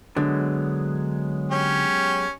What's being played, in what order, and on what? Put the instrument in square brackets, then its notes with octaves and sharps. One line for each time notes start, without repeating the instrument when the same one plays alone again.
[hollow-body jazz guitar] D3 [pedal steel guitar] F#3 G#3 B3
[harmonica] C#4 G4